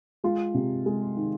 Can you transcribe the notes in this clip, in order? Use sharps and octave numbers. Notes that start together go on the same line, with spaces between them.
G#3 F4
C3
G#3
D#3